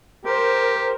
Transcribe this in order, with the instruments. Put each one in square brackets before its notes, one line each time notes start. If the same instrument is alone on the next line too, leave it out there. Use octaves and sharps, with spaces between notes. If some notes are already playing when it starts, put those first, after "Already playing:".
[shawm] G4 [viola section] A#4 C5